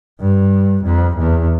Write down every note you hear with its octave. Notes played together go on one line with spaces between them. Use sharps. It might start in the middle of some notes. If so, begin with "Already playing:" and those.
G2
F2
E2